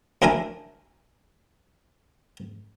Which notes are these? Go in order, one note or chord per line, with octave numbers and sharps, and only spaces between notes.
D2 D4 E4 A#4 G#5